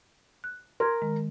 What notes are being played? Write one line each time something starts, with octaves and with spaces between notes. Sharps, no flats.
F#6
A#4 C6 F6 G#6
D#3 G#3